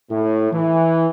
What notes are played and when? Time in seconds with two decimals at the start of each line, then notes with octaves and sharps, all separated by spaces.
0.10 A2
0.52 E3